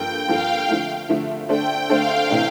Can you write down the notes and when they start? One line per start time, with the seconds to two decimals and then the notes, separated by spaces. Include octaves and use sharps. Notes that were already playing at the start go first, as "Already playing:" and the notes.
Already playing: G2 F3 A#3 F4 A4 G5
0.28 G2 F3 A#3 F4 A4 F5
0.69 D3 F3 A3
1.09 D3 F3 A3
1.49 D3 A3 D4 A4 C5 G5
1.89 D3 A3 D4 A4 C5 F5
2.30 C3 E3 A3 D4